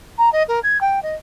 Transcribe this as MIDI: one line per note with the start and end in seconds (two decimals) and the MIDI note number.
0.18 0.29 82
0.32 0.43 75
0.48 0.60 70
0.63 0.80 92
0.81 1.02 79
1.03 1.15 75